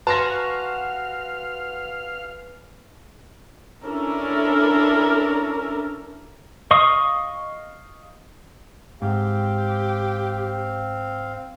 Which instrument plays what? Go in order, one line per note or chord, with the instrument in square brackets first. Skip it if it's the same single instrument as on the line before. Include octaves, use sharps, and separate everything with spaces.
[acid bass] F#4 [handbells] B4 G#5 [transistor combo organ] F5 [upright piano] A5 C6 A#6
[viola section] C#4 D4 E4 A4 A#4
[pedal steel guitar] D#5 F5 C#6 D#6
[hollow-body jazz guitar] G#2 [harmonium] C4 F5 [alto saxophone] G4